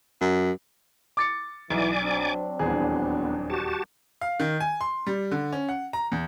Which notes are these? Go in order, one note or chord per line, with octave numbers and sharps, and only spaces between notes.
F#2
D6 A6 C#7
B1 E3 D5 G#5 D6
F#3 C4 D4
D#1 E2 B3 G#4
F#4 G4 A5
F5
D#3
G#5
C6
G3
D3
C#4
F#5
A#5
E2